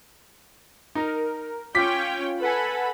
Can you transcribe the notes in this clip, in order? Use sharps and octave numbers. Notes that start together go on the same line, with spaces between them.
D#4 A#4
C#4 F4 C#5 G5 D6 B6
A4 B4 F#5 G#5 B5